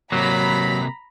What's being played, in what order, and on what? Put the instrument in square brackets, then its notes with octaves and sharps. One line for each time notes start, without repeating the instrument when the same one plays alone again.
[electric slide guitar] C3 A#3 [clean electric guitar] F#3 [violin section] A#5 B5 B6